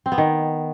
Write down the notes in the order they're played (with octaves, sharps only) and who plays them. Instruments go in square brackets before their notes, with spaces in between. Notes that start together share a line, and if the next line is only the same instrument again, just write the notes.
[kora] C4
B3
D#3